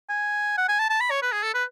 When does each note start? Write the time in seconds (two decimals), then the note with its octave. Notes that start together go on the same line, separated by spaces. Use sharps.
0.09 G#5
0.58 F#5
0.68 G#5
0.79 A5
0.90 A5
1.00 B5
1.11 C#5
1.22 B4
1.32 G#4
1.43 A4
1.54 B4